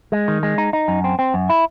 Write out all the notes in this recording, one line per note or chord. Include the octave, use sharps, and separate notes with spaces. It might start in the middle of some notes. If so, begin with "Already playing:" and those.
G#3
D#3
G#3
D#4
D#4
F#2
C4
C4
F#2
E4